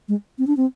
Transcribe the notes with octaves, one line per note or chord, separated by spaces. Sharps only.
G#3
C4
D4
C4